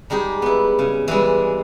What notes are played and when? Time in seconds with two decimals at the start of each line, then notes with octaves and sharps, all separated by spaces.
0.10 G3 G#3 D#4 G4
0.42 B3 E4
0.79 C#3
1.08 E3 G3 G#3